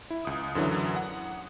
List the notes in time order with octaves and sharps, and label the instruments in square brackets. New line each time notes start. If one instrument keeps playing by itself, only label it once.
[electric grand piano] E4
C#2 D#6
F#2 D3 E3 F#3
F#5